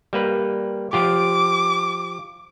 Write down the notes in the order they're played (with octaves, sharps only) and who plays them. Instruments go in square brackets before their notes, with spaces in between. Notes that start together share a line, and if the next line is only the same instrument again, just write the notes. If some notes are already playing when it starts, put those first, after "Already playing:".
[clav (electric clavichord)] G3 A#3 B4
[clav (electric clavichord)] F3 F4 G4 [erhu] D6